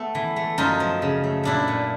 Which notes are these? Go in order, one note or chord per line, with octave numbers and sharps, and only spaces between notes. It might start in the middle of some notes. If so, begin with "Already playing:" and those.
Already playing: A3 B3
E3
A3
F#2 D#4 F4
F3
C#3
A3
A#2 D4 E4
A#2